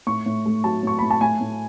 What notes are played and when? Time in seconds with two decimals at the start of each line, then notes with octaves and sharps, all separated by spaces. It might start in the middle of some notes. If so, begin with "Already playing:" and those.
0.07 A2 C#6
0.26 A2
0.46 A3
0.64 F#3 A5
0.83 A2 C#6
0.99 A2 B5
1.11 A5
1.21 A2 G#5
1.41 A2